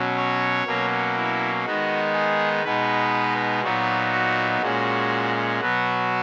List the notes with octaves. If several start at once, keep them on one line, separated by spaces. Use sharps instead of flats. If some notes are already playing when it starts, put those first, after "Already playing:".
Already playing: B2 F#3 C#4
C#5
B2 F#3 A#3 C#4
E4
D#3 G#3 B3 D#4 F#4
G#4
B2 G#3 B3 D#4 B4
A#2 F#3 B3 D#4 F#4
F#4
A#2 G#3 C#4 F#4
B2 F#3 B3 F#4